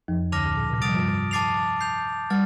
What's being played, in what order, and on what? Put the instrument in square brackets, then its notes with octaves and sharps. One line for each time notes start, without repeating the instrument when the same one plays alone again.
[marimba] F2 F3
[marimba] D2 D3 [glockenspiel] A5 D6 F6 A#6 F7
[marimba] A2
A#2
C3
[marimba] G3 [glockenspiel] D#6 A6 D7 F7
[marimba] F3
G2 G3
[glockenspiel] A5 D6 A6 C7 F7
G6 C7 F7
[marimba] G3 [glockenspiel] F6 A6